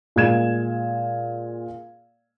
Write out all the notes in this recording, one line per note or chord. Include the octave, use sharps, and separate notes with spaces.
A#2 G#3 G#6 E7